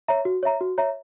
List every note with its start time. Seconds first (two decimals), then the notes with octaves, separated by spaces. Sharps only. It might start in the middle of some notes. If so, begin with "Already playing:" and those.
0.08 C#5 E5 A#5
0.25 F#4
0.43 C#5 E5 A#5
0.61 F#4
0.78 C#5 E5 A#5